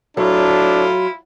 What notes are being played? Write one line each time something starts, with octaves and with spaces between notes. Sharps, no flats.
A2 F#3 D4 E4 F4